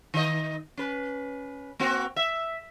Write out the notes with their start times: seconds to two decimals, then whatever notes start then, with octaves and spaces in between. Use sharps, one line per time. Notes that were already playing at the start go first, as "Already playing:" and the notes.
0.14 D#3 D#5
0.77 C#4 B4
1.80 A#3 C4 F#4
2.16 E5